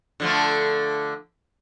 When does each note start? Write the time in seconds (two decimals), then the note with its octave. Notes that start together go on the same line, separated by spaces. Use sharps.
0.20 D3 F3 A3